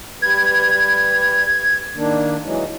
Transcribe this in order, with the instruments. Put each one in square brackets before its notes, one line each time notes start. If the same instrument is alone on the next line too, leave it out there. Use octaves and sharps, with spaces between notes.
[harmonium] G3 B4 [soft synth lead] G#6
[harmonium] D#3 A#3 D4
E3 F#3 G#3